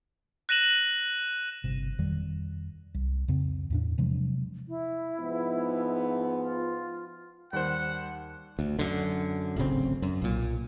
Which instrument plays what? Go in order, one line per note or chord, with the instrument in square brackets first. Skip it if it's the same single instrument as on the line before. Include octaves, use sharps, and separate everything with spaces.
[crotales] F#6 A#6 D#7 E7 F#7
[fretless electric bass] G1 C3
F2 D#3 G3
C2
F2 C#3 C4
E2 A2 D4
C3 F3 F#3 G#3
[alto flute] E4
[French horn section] G#2 F3 B3
[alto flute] F4
[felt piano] D#2 [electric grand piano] G3 C5 [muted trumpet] F#5
[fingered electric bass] D2
F#2 D3
D1 G#1 C#3 C4
F#2
B1 A#2